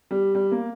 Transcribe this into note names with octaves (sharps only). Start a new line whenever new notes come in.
G3
G3
A#3